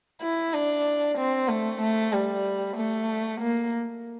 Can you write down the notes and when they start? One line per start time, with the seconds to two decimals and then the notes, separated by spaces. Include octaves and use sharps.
0.22 E4
0.54 D4
1.18 C4
1.49 A3
1.81 A3
2.13 G3
2.77 A3
3.41 A#3